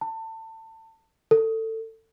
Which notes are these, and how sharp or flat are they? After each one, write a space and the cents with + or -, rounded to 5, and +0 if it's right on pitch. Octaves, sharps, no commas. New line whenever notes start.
A5 +25
A4 +20